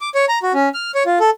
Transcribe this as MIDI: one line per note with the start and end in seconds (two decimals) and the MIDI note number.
0.01 0.09 86
0.15 0.25 73
0.29 0.39 82
0.43 0.53 66
0.54 0.69 61
0.74 0.91 89
0.95 1.03 73
1.06 1.19 65
1.20 1.30 69